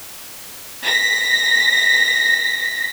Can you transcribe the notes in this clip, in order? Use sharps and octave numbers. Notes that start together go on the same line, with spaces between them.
A#6 B6